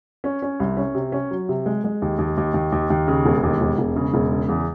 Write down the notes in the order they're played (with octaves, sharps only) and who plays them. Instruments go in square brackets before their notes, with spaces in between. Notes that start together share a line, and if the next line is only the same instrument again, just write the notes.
[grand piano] C#4
C#4
C2
C#4
C3
C#4
F#3
C3
G#3
G#3
D#2
D#2
D#2
D#2
D#2
D#2
C#3
E1
D#2
E1
E1
C#3
E1
C#3
E2